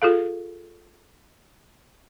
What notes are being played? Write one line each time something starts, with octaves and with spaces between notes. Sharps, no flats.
F4 G#4 A4 F5